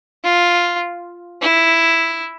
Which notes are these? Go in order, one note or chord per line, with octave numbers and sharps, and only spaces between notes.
F4
E4